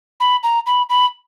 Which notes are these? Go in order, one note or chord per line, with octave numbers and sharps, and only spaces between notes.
B5
A#5
B5
B5